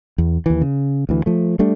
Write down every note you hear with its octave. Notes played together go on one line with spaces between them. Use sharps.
E2
D#2 E3
C#3
D2 E3
F3 A3
G3 A3 D4